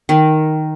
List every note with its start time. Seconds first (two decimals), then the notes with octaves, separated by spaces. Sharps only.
0.09 D#3